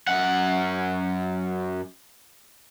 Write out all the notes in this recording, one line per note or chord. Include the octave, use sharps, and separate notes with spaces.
F#2 F#5